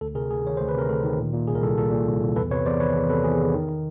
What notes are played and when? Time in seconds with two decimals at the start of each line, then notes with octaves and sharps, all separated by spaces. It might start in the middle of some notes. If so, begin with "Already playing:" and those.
0.01 D2 A4
0.15 C3 G#4 A#4
0.29 D2 G#4
0.44 D#3 C#5
0.57 D2 C5
0.69 B4
0.75 C3 A#4
0.89 D2 A4
1.04 D#3
1.18 A#2
1.34 A#2
1.47 C2 G#4
1.55 A#4
1.62 C2 A4
1.78 A#2 A4
1.91 A#2
2.06 C2
2.22 C2
2.36 E2 A4 B4
2.50 C3 B4 C#5
2.66 E2 C5 D5
2.80 D#3 B4 C#5
2.95 E2
3.09 C3 A4 B4
3.24 E2 G#4
3.40 D#3
3.54 D#3
3.69 D#3